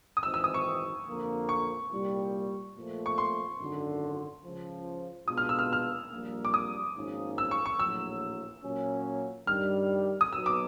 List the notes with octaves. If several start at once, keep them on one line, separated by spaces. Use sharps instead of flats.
D#6
G#1 G#2 E3 G#3 C4 E6
E6
D#6
C#6
F2 D3 F3 A#3
C#6
C2 A#2 G3
A#2 F3 A3
C#6
C6
G#1 F#2 D3
C#2 C#3 F3
B2 G#3 B3 D4 F4 D#6
F6
E6
F6
F6
A#1 A#2 G3 A#3
D6
D#6
G#1 G#2 F3 A#3 C#4
E6
C#6
C#6
A#1 A2 F#3 E6
A#2 F#3 A#3 C#4
G2 D#3 G3 F6
D#6
B1 B2 F#3 B3 E6
D6